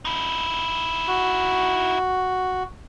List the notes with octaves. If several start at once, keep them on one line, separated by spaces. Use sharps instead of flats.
D#4 E4
F#4